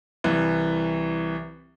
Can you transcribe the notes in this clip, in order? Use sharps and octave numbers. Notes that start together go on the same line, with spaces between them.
C2 E3